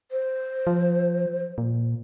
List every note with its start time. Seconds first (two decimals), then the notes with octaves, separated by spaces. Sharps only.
0.11 C5
0.67 F3
1.58 A#2